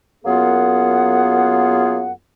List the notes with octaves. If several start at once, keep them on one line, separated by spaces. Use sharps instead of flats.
F#2 A#3 B3 F4 G#4 F#5